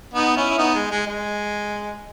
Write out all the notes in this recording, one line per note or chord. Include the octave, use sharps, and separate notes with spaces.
B3 D#4
C#4 E4
E4
B3 D#4
G#3
G#3
G#3